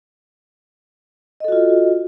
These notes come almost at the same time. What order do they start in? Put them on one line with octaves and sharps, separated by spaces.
D#5 A4 F#4 F4